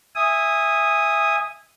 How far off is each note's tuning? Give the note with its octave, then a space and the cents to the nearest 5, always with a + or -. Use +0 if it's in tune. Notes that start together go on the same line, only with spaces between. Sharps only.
E5 +0 G#5 -20 D#6 +0